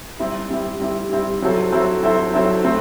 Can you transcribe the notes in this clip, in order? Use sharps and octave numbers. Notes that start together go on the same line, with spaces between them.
G3 C4 E4 G4
G3 C4 E4 G4
G3 C4 E4 G4
G3 C4 E4 G4
F#3 C4 E4 A4 C5
F#3 C4 E4 A4 C5
F#3 C4 E4 A4 C5
F#3 C4 E4 A4 C5
A3 C4